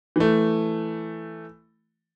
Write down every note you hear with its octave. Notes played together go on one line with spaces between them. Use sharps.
E3 A3